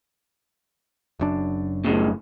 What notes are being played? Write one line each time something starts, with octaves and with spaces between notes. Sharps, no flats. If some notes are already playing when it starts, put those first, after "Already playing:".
F#1 F#2 D4
A2 C#3